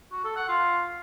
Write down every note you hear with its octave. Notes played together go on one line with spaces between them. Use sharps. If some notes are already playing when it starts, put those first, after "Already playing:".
F#4
A4
F#5
F4